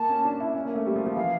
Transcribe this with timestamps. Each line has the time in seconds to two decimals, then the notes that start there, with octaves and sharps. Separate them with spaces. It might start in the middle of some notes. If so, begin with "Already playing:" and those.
Already playing: A#3 A5
0.09 C#4
0.25 D4
0.40 E4
0.55 C#4
0.65 A#3
0.75 A3
0.86 G3
0.96 F3
1.02 G3
1.06 F3
1.16 E3 F5